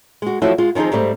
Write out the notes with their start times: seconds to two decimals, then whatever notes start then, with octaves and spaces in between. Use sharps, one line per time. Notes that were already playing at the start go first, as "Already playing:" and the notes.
0.22 G#3 F#4
0.42 F3 F#3 A3 E4 F#4
0.58 G#3 F4
0.75 D#3 F3 C4 D#4 G#4
0.92 G#2 G3 A3 C4